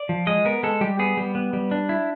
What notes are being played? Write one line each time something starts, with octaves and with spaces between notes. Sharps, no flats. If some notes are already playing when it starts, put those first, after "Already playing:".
Already playing: D5
F3
G#3 D#5
B3 A#4
G#3 A4
G3 G4
B3 G#4
G3
B3
G3
D4
E4